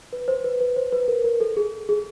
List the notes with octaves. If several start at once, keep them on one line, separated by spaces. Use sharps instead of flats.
B4
C5
B4
B4
C5
B4
A#4
A#4
A4
G#4
G#4